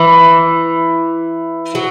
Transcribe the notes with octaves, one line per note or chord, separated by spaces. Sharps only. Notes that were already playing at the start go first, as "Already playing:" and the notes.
Already playing: E3
F#3